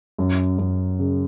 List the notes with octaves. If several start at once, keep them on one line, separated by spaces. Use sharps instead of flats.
F#2
F#2
C#3